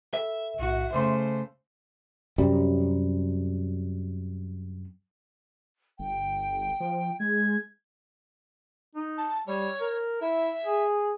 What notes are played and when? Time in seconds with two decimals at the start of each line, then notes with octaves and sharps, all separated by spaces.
0.14 A4 B4 E5
0.59 B1 A2 F#4
0.93 C#3 A3 C5 C6 D6
2.38 F#2 C3 G3
5.99 G1 G5
6.80 F3
7.20 G#3 G#6
8.95 D#4
9.18 A5
9.47 G3 C#5
9.81 A#4
10.21 E4 E5
10.65 G#4